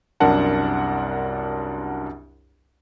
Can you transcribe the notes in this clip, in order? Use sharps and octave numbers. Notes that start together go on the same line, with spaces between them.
C2 F#2 D4 A#4 F#5 A5